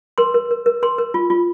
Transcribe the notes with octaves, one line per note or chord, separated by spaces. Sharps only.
A#4 C6
A#4
A#4
A#4
A#4 C6
A#4
F4
F4